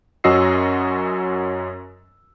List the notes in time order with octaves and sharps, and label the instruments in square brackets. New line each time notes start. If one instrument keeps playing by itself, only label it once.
[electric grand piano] F#2 C#4 F#4 D#5 E6 C7